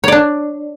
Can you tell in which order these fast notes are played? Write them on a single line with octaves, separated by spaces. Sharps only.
C#5 D5 D4